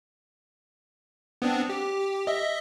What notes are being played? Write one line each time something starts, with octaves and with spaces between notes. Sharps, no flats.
B3 C4 D4
G4
D#5 E5